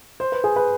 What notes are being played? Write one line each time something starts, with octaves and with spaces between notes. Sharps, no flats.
C5
B4
G#4
B4